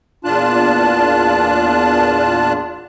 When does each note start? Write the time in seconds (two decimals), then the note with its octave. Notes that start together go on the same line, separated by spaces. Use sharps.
0.25 E2 A#2 D4 F4 A5 F#6